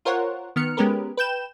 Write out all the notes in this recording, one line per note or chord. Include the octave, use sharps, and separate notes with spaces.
F4 A#4 C5 C#5 F#5
D#3 B3 F6 C#7
G#3 B3 C#4 G4 A#4 B4
B4 G5 G6 E7